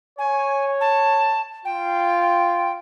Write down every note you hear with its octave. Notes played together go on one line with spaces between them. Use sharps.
C#5 G#5
A5
F4 G5